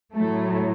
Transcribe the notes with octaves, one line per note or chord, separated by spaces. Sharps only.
A2 F#3 A3